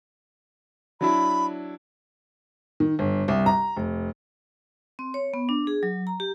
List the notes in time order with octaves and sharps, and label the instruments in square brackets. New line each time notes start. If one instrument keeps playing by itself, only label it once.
[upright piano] F#3 D4 E4 [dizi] B5
[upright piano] D#3
G1
C2
A#5
F1
[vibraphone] C4
C#5
B3
D4
G#4
F#3
A#5
G4